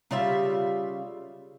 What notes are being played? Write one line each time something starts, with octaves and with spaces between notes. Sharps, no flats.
C#3 G3 F4 E5